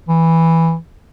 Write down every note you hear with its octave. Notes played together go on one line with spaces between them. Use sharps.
E3